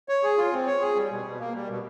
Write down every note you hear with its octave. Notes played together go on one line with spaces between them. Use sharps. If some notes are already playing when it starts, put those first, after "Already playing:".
C#5
G#4
F4
C4
C#5
G#4
G3
B2
B2
A#3
G3
B2